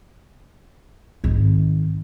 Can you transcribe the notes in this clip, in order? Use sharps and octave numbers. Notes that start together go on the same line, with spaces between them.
G#1 D#3